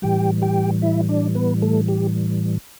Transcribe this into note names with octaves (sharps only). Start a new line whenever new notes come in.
A2 E3 G3 G4 G5
G4 G5
E4 E5
D4 D5
B3 B4
A3 A4
G4